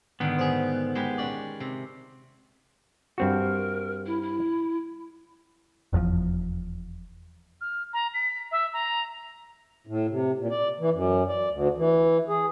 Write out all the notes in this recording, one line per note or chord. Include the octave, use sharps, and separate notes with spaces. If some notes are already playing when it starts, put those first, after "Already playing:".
G#2 D3 D#3 B3
G#4 C5
G#3 G4 B4
C#4 D5
C3
G2 C4 F#4 A#4
E4
E4
F1 E2 G#2 F3
F6
A#5
B6
E5
A#5
A2
C3
A#2
D5
E3
F#2
D5
D2
E3
G#4